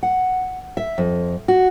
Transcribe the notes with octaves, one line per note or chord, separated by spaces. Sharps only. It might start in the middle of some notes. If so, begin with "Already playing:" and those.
F#5
E5
F2
F#4